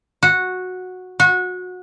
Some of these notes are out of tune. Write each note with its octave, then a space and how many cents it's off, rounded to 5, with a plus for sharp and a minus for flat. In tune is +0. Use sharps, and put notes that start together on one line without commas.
F#4 -10
F#4 -25